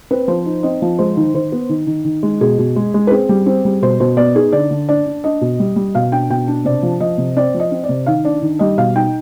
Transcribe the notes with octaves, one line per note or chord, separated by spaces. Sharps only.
C4 B4
F3 C5
D#4
C4 D#5
F3
G#3 C5
D#3
D#3 C5
B3
D#3
D#3
D#3
G#3
B2 G#4
B2
G#3
G#3
B4
C4 G#4
G3
C4
G3
B2 C5
B2 C5
B3 D5
D#4 G#4
D3 D5
D3
D4 D5
D4
D4 D#5
B2
G3
G3
B2 F5
D4 G5
B2 G5
D4
C3 D5
F3
F3 D#5
C3
C4 D5
F3
D#5
C4
D5
C3
D#3 F5
D4 D5
D#3
G3 D#5
B2 F5
D#4 G5